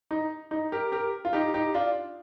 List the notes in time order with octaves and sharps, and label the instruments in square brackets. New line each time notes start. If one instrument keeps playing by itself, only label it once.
[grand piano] D#4
D#4
G4 A#4
G4 A#4
F4
D#4 G4
D#4 G4
D4 F4